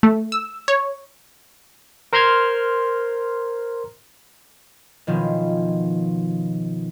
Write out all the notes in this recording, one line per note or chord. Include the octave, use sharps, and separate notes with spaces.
A3
E6
C#5
A#4 C5 A#5 C6 F6 G#6
B2 D#3 F3 C#4